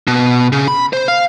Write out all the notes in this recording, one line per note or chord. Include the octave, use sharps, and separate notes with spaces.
B2
C#3
B5
C5
F5